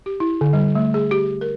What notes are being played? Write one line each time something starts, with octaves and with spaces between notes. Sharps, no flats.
G4
E4
D3
G3
A3
G#4
G4
A#4